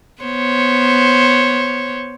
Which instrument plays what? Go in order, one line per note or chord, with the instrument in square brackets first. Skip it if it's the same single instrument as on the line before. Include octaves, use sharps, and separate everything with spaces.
[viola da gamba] B3 C5 C#5